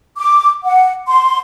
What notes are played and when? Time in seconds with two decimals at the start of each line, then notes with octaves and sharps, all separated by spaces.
0.19 D6
0.65 F#5
1.08 C6